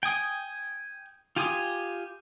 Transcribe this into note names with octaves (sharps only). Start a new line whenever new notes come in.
G5 G#5 D#6
F4 G4 G#5 C6 D#6